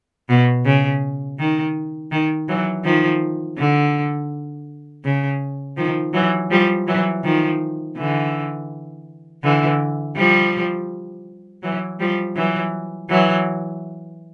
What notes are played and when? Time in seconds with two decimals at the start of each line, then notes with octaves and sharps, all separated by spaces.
0.29 B2
0.65 C#3
1.39 D#3
2.12 D#3
2.48 E3 F#3
2.84 D#3 F3
3.57 D3
5.04 C#3
5.77 D#3 F3
6.14 E3 F#3
6.50 F3 G3
6.87 E3 F#3
7.24 D#3 F3
7.97 D3 E3
9.43 D3 E3
10.16 F3 G3
11.63 E3 F#3
12.00 F3 G3
12.36 E3 F#3
13.10 E3 F#3